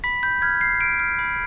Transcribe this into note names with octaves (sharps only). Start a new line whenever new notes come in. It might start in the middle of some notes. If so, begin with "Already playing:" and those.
B5 B6
B5 G6
F6 G#6
F6 C7
F6 D7
F6
B5